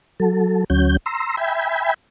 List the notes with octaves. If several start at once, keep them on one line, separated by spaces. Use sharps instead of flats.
F#3 A4
D2 F#3 C#4 G6
A#5 C6 E6
E5 G5 G#5 B5